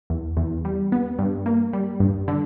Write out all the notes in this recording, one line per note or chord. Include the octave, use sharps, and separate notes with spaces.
E2
E2
G3
B3
G2
A#3
G3
G2
D3